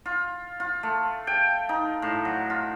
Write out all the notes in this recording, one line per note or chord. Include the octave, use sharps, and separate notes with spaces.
F4
F4
A3
G5
D#4
A2
F#3
F4